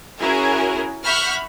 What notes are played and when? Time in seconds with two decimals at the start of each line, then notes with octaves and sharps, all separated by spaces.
0.19 C#4 E4 F#4 G#4 A#4
1.05 E5 F#5 B5 C#6 F6 G6